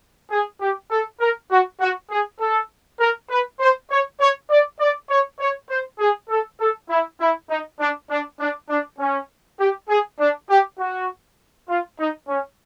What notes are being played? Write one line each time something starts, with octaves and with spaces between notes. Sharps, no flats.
G#4
G4
A4
A#4
F#4
F#4
G#4
A4
A#4
B4
C5
C#5
C#5
D5
D5
C#5
C#5
C5
G#4
A4
A4
E4
E4
D#4
D4
D4
D4
D4
C#4
G4
G#4
D4
G4
F#4
F4
D#4
C#4